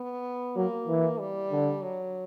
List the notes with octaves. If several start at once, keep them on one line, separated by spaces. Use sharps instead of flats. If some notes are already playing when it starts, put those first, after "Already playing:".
Already playing: B3
F#3 A#3
E3
G3
D3
F#3